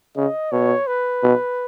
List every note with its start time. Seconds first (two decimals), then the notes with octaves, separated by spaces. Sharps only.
0.16 C#3 D#5
0.52 B2 C#5
0.87 B4
1.23 B2